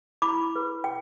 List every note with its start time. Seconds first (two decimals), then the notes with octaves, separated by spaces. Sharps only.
0.22 E4 B5 D6
0.56 B4
0.84 G5